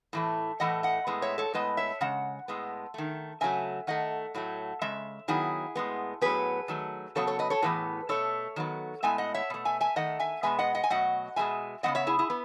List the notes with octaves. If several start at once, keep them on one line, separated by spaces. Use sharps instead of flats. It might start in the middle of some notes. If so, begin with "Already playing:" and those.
A2 E3 A3
A2 E3 A3 D#5 F#5
D#5 F#5
A2 G#3 B3
C#5 E5
A4 C#5
A2 G#3 B3 B4 D#5
C#5 E5
C#3 G#3 F#5
A2 G#3 B3
D#3 A3
C#3 F#3 A3 E5 G#5
D#3 A3 D#5 F#5
A2 F#3 A3
C#3 G#3 E5
D#3 F#3 B3 E4 G#4
A2 G#3 B3
A2 F#3 B3 G#4 B4
D#3 F#3 A3
C#3 F#3 B3 A4 C#5
A4 C#5
B4 D#5
A4 C#5
A2 E3 B3 G#4 B4
B2 A3 A4 C#5
D#3 F#3 B3
A2 G#3 B3 E5 G#5
D#5 F#5
C#5 E5
B2 A3
E5 G#5
E5 G#5
D#3 A3 D#5 F#5
E5 G#5
B2 G#3 B3 E5 G#5
D#5 F#5
D#5 F#5
G#5
B2 F#3 A3 D#5 F#5
B2 G#3 B3 E5 G#5
C#3 G#3 B3 D#5 F#5
C#5 E5
E4 G#4
E4 G#4
B3